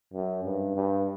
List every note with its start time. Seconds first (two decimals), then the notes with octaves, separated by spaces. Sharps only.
0.13 F#2
0.44 G2
0.76 G2